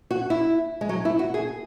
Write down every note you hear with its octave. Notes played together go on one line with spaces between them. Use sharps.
F#4
E4
G#3
F#3
E4
F#4
G#4